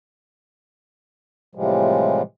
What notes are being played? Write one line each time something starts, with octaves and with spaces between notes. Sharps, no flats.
A2 C3 E3 F3 G3 G#3